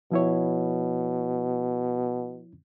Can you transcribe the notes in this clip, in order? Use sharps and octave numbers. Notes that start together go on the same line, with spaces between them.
B2 F3 E4 C#5